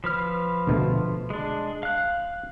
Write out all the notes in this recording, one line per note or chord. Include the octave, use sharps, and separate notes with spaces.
F3 B4 F6
D2 B2 A3
G#3 D4
F5 F#6